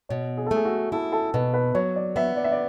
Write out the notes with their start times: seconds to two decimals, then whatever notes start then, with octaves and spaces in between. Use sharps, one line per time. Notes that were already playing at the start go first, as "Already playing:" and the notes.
0.09 B2 C#5
0.37 G#4
0.46 A4
0.51 A3 G#4
0.65 F#4
0.92 E4 A4
1.12 A4
1.34 B2 B4
1.54 B4
1.75 F#3 C#5
1.96 D5
2.16 B3 E5
2.37 D5
2.44 E5
2.52 D5